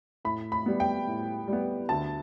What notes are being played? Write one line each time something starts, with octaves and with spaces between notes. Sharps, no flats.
A2 B5
B5
G3 B3
G5
A2
G3
B3
D2 A5